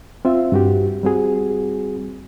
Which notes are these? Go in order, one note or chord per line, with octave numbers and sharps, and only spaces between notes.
C4 F4 E5
G2 F#4 G4
G3 C4 F#4 G#4